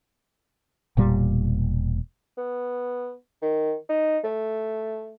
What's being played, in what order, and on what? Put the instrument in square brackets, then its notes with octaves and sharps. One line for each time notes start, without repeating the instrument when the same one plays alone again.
[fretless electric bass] E1 A#2 G3
[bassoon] B3
D#3
D#4
A3